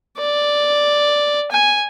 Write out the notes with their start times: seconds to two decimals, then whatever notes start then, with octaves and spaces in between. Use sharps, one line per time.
0.18 D5
1.51 G#5